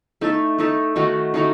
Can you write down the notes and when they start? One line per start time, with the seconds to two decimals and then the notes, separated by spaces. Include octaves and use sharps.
0.21 A3 D#4 A4 E5
0.58 A3 D#4 A4 E5
0.96 D#3 A3 D#4 F#4
1.34 D#3 A3 D#4 F#4